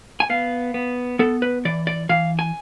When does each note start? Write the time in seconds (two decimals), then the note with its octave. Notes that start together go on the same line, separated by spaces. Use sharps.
0.20 G#5
0.29 B3 F5
0.74 B3
1.19 B3 A4
1.42 B4
1.65 E3 D5
1.87 D5
2.09 E3 F5
2.39 G#5